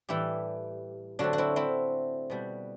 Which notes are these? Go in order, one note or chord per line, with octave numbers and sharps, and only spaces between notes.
A2 E3 G3 E4 G4
D3 F#3 A3 C4 D4 F#4
F#4
C4 E4
C4 E4
B2 G3 B3